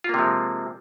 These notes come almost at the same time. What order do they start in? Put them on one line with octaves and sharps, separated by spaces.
F4 A#3 C3 F3 G#3